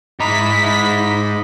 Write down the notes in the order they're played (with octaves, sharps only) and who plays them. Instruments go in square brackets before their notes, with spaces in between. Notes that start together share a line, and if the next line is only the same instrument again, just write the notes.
[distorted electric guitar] G#2 A#5 [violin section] E4 B6 [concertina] D#5 B5 D6